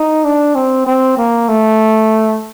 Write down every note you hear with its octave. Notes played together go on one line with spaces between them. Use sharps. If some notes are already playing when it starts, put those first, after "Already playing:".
Already playing: D#4
D4
C4
C4
A#3
A3